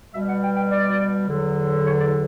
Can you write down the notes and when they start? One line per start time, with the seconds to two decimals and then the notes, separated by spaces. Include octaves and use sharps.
0.14 B2 G3 E5
0.29 F#5
0.43 G5
0.56 G5
0.71 D5
1.28 E2 D3 F#3
1.84 C#5
1.99 D5